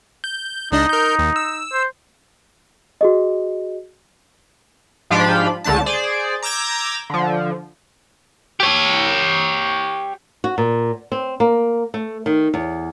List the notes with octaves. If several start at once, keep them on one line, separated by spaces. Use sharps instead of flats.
G6
C#2 D4 D#4 D#5
A#4 G6
D#2
E6
C5
F#4 G#4 D#5
G#2 F3 D4 F4 G4 B5
C#2 D3 A3 D4 A5
G#4 C5 D5
A#5 D6 E6 G6 G#6 A#6
D3 F3
G4 C#5
F#4
A#2
C4
A#3
A3
D#3
E2